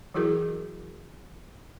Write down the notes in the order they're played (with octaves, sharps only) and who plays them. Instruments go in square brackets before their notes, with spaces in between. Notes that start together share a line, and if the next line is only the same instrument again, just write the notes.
[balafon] E3 F#3 E4 F#4 G#4 A#4